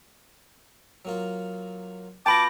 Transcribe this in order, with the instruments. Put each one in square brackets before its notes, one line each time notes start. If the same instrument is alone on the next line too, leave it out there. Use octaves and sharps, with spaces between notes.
[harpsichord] F#3 A#3 F4
[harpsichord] B3 F4 F#4 [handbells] G5 B5 A#6 [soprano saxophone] A5 [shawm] D6